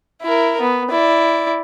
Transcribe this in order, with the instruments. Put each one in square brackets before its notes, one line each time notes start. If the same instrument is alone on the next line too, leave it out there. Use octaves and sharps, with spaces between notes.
[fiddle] E4 A#4
B3
E4 D5